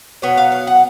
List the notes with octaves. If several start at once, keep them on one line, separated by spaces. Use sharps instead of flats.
B2 F#3 B3 C#5
F5
F5
F#5